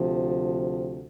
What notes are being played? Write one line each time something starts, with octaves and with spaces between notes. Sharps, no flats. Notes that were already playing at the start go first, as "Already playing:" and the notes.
Already playing: D2 C3 F3